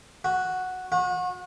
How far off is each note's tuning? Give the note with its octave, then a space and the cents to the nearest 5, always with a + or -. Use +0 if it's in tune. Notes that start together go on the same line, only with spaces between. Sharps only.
F#4 -5
F#4 -35